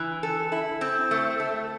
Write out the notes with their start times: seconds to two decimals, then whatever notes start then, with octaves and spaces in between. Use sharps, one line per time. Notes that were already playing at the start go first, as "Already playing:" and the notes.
Already playing: E3
0.23 A4
0.52 E4
0.81 C4
1.11 A3
1.40 A3